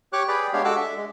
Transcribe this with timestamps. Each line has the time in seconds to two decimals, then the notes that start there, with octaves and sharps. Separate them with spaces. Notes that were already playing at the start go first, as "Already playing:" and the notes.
0.13 G4 C#5 C#6 D6 F#6
0.28 G#4 B4 D5 G5 B5
0.53 G#3 B3 D4 G4 C#5 F5
0.65 G#3 F#4 A4 D6 E6 F#6
0.76 D4 A4 E5
0.97 G#3